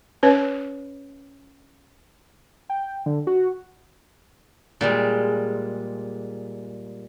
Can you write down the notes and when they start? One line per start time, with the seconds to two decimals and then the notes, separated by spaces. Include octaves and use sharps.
0.23 C#4 B4 C#5
2.70 G5
3.06 D3
3.27 F#4
4.81 A#2 G3 G#3